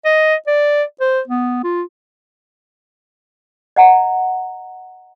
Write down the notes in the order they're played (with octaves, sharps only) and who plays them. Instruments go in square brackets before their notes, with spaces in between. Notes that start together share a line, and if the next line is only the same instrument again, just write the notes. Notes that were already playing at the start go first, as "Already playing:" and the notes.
[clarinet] D#5
D5
C5
B3
F4
[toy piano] D#5 F#5 A#5